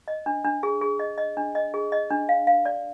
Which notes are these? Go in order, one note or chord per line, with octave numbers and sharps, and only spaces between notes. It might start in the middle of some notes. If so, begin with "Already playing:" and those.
D#5
D4
D4
G#4
G#4
D#5
D#5
D4
D#5
G#4
D#5
D4
F5
F5
D5